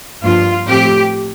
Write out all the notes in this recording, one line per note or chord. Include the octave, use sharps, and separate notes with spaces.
G2 F3 A#3 F4
A2 F3 A3 C4 G4